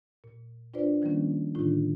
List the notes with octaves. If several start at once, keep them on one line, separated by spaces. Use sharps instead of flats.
A#2
D4 F4 B4 C5 D5
D#3 F3 G3 A#3 C#4
A2 D3 D#3 D4 D#4 F4